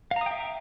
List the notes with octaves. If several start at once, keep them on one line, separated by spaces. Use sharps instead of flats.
E5 F5 G5 A#5 D#6